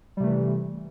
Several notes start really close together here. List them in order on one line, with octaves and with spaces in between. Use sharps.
G3 C3 A3 E3